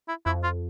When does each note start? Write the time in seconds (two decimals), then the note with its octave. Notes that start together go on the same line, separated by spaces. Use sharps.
0.08 E4
0.26 F2 E4
0.44 F4